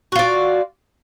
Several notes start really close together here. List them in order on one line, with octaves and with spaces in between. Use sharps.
F#4 F4 D5